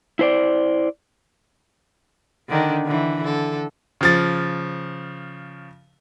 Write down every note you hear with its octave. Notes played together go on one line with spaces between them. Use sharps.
E4 C5 D5
D3 D#3 D4
D3 E3
D3 A4
C#3 F3 A6